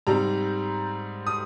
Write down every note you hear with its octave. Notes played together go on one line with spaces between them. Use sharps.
G#2 G3 C4 A#5
D#6